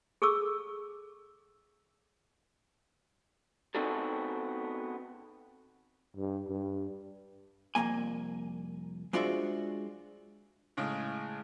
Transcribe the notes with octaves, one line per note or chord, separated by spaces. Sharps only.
G#4 A4 C#6 D6 E6
B3 C4 D#4 F#4 G#4 A4
G2
G2
C2 F2 G#2 F#3 A#3 G#5
G#3 D4 F4 F#4 C5 E5
A2 C#3 G#3